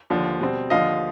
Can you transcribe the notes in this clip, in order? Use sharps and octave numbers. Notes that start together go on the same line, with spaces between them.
D#2 D3 F3
B2 G3 C4
D#2 D3 F3 D#5 F5